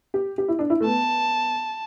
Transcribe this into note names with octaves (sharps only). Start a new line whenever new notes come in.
G4
G4
E4
D4
E4
A3
B3 A5